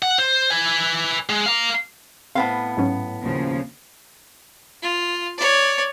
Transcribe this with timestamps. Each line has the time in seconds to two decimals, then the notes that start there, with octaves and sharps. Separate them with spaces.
0.02 F#5
0.18 C5
0.50 B4 G#5
1.29 G#3
1.46 F5 A#5
2.35 A2 B3 C4 F5
2.77 G#2 F#3 C#4
3.22 D#2 C#3 F3
4.82 F4
5.38 C#5 D5